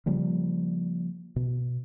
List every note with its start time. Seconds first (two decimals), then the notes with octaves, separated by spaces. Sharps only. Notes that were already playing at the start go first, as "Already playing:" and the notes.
0.06 C#3 F3 G3 A#3
1.36 B2